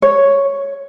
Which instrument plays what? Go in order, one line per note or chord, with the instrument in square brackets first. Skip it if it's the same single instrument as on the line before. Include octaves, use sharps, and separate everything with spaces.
[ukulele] C#5